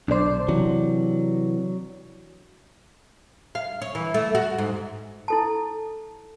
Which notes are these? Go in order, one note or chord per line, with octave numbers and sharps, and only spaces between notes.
B1 D4 C5 D5
C3 E3 F#3
F5
C#5
E3
A3
F#4
G#2
E4 A4 A5